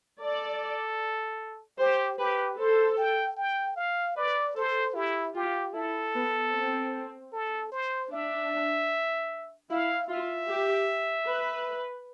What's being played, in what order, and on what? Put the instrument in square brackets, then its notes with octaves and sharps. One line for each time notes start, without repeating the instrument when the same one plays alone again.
[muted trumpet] A4 [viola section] D5
[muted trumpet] G4 [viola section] C5
[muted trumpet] G4 [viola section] B4
[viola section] A4 [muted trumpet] C5
[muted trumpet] G5
G5
F5
[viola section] B4 [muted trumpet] D5
[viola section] A4 [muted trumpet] C5
[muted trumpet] E4 [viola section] G4
[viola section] F4 [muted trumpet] G4
[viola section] E4 [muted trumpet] A4
[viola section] B3
C4
[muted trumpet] A4
C5
[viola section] D4 [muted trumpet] E5
[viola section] E4 [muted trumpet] F5
[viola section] F4 [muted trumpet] E5
[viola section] G4
B4